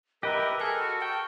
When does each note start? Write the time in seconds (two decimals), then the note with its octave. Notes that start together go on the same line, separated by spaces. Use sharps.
0.23 G4 A#4 B4 D#5 E5
0.60 G#4 A4 F6
0.80 F#4
1.02 G5 C#6